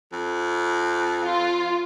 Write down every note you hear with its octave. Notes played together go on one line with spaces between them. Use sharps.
F2
F4